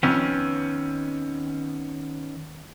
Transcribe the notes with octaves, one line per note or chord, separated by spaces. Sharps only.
F2 D#3 B3 C#4